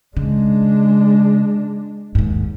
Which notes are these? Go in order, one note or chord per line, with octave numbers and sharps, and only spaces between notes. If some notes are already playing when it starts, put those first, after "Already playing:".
C#3 G#3 D4
D#2 G#2